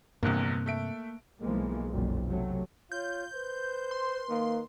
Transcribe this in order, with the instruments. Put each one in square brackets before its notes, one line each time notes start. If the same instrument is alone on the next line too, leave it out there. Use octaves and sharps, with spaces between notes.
[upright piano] F1 A#1 E2 [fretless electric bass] G2 C3 [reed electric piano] A#3 F#6
[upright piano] A3 E5 D7
[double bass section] B1 E3 F3 G#3 A#3
F#1 B1 F2 A#2
C3 F#3 A3
[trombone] F4 [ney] C#5 [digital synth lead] G6
[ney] B4 [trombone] C5
[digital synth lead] C6
[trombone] D#3 [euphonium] A#3